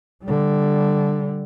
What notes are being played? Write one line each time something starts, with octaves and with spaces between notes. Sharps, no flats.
D3 G3